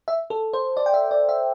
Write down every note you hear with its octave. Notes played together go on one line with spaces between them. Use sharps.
E5
A4
C5
D5
G5
E5
D5
E5